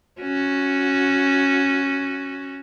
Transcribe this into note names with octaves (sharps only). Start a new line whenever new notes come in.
C#4 F#4